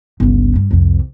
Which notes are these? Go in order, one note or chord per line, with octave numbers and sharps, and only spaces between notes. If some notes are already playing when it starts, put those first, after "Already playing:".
G1 C#2
G2
C2 F2